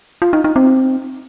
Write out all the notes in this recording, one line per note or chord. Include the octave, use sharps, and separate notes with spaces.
F4
D#4
D#4
C4